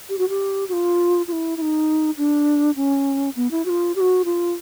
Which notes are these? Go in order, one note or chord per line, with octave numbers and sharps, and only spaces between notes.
G4
F#4
G4
F#4
F4
F4
E4
E4
D#4
D4
C#4
B3
E4
F#4
F4
G4
F#4
F4